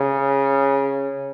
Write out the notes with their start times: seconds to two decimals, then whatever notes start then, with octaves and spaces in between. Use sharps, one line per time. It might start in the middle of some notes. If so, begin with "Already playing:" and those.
Already playing: C#3